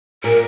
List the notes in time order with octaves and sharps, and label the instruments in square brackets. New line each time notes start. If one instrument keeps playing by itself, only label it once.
[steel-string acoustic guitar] A#2 [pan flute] A#4